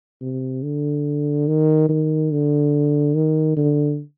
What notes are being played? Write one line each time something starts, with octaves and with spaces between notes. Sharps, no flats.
C3
D3
D#3
D#3
D3
D#3
D3